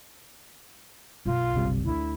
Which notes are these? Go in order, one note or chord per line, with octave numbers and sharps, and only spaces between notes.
B1 F#2 F4
F#1 C3 G3
D2 D3 E4